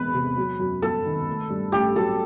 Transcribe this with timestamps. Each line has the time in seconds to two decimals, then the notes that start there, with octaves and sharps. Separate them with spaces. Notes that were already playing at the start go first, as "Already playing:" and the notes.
Already playing: E1 E2 B4
0.14 C3
0.37 F#3
0.60 F#2
0.82 G1 A4
1.05 D#3
1.28 A3
1.50 G2
1.72 A1 G4
1.95 F#3 A4